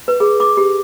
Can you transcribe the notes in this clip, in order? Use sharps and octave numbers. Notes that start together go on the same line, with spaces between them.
B4
G#4
D6
G4